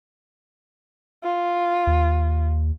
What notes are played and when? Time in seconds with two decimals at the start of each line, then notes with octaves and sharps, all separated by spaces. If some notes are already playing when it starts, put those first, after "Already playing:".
1.23 F4
1.87 D#2